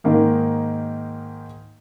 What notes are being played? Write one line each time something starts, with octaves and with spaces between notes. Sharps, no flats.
G#2 D#3 A#3 D#4